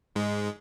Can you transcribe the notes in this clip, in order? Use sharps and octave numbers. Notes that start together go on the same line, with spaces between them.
G#2 G#3